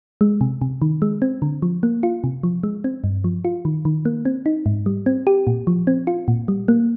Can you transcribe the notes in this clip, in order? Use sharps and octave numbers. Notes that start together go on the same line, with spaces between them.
G#3
C3
C3
D#3
G#3
C4
D3
F3
A#3
F4
C3
F3
G#3
C4
G2
F3
F4
D#3
D#3
A#3
C4
D#4
G#2
G3
C4
G4
A#2
F3
C4
F4
A#2
G3
A#3